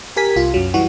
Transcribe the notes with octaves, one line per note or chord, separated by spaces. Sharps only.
G4 A#4 G#5 B6
C2 F4
F#2 F#3
E3 G3 F#4